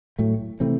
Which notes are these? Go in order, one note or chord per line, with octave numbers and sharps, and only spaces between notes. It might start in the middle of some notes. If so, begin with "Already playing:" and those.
A2 F#3 A3
C3 E3 A3 C4